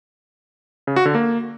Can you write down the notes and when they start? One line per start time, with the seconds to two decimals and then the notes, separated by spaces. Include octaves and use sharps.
0.87 C#3
0.96 F#4
1.05 D3
1.15 A#3